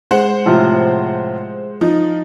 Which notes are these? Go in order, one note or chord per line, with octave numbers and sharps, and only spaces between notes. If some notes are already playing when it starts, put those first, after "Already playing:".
G#3 C5 F#5
A2 C3 F3
F3 D#4